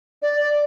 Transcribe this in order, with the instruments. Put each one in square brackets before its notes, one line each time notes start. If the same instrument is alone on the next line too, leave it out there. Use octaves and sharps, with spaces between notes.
[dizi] D5